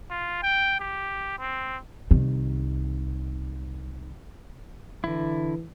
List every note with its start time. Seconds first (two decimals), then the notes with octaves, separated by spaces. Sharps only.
0.10 F4
0.43 G5
0.80 G4
1.39 C4
2.11 C2 D#3
5.04 D3 E3 E4